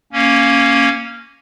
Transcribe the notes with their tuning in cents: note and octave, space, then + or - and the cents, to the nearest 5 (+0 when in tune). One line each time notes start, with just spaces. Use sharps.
A#3 +0 C#4 +0